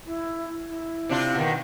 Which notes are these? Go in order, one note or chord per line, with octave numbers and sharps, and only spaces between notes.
E4
E4
C3 D4 F4
B2 D#3